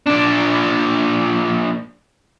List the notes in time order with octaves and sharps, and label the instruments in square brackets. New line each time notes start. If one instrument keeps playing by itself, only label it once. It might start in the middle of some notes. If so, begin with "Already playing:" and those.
[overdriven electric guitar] A#2 D4